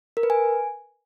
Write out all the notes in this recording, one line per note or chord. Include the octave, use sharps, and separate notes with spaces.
A#4
B4
G#5